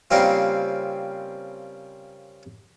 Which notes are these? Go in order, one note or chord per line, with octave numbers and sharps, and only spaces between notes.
C#3 G3 A#3 C4 F4